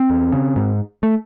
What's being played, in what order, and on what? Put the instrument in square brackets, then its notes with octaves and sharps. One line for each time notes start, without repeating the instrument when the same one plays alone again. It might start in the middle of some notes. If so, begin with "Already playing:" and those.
Already playing: [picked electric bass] C4
E2
C#3
G#2
A3